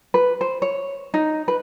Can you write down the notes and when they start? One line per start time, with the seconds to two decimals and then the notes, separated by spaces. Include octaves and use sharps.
0.14 B4
0.41 C5
0.62 C#5
1.14 D#4
1.48 B4